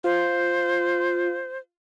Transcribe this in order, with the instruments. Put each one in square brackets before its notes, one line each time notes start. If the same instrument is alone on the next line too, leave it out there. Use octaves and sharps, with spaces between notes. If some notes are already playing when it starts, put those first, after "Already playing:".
[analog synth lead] F4 [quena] C5